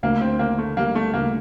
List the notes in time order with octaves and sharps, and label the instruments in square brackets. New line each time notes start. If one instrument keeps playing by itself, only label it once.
[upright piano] D2 [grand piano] A#3
[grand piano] C4
[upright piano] D3 [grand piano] A#3
[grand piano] A3
[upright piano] G3 [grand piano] A#3
[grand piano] A3
[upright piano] D2 [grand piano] A#3